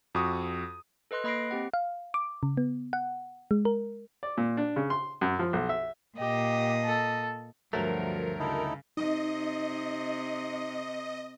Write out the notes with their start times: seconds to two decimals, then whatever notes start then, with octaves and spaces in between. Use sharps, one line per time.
0.15 F2 F#4 C#6 D#6
1.11 A4 B4 D#5 C6 F#6
1.24 A#3 D#5 B5 A#6 C7 D7
1.51 C4 G4 F#5
1.74 F5
2.14 D6
2.43 C#3
2.57 B3
2.93 F#5
3.51 G#3
3.65 A#4
4.23 D5
4.38 A#2
4.57 D4
4.76 C#3
4.90 C6
5.21 F#2
5.39 F3
5.53 B1
5.69 E5
6.19 A#2 G4 D#5
6.85 A4
7.73 D2 G2 F3 F#3 A3 A#4
8.39 C#3 D#4 E4 A4
8.97 C3 D#4 D#5